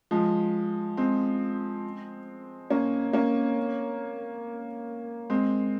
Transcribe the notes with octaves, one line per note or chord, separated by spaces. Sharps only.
F3 G#3
G#3 C4
A#3 C#4
A#3 C#4
G#3 C4